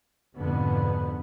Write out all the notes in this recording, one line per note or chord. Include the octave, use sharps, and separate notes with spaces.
F2 G#2 B2 D3 B3